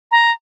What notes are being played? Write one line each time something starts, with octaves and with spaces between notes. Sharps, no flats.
A#5